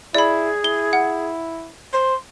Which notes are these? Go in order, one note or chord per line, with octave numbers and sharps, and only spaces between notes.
E4 G#4 D5 B5
E4 G7
F#5
C5 C6